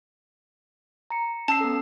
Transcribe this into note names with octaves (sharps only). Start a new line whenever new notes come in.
A#5 C#7
C#4 A5 E6 C7
B3 A4